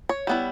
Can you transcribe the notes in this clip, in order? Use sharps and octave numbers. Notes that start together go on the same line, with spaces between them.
C#5
G3 B3 E4